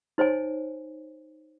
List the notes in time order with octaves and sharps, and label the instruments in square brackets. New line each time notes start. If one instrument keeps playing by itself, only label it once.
[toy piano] D#4 C5 C#5 G#5